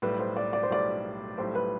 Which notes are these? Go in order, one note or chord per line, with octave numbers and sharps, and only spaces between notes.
B1 A2 G3 B4
C5
D5
D5
C5
B1 A2 G3 D5
B1 A2 G3 C5
B4